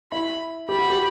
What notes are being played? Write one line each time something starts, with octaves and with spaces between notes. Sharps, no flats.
E4 B5
G4 B5
F#4
G4